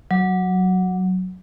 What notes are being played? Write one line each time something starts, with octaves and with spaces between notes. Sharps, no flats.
F#3